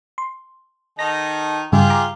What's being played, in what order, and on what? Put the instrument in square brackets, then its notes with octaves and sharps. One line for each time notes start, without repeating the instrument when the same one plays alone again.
[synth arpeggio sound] C6
[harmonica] D#3 D#4 A4 [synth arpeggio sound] A#6
[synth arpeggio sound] G2 C#3 G3 [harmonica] F4 G4 G#4
[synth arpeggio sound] A#5 D6